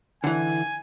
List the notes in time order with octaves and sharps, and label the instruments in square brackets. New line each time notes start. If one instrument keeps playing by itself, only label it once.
[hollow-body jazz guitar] D3 E3 [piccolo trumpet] G#5